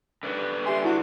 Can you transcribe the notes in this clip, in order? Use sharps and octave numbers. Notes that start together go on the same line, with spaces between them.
D3 B4 D5
G4 E5 G#5 C6
E4 F#4